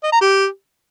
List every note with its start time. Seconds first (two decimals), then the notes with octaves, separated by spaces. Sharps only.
0.04 D#5
0.12 A#5
0.21 G4